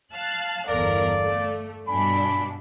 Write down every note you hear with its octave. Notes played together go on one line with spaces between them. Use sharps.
F5 A5 F#6
G1 E2 A4 A#4 D5 F5
A3
G2 B2 D4 G#5 B5